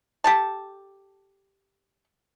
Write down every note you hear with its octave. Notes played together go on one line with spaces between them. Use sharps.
G4 A4 A5